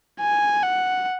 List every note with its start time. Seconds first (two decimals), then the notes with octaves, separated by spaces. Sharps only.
0.20 G#5
0.63 F#5